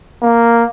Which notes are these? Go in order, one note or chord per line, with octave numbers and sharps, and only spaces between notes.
A#3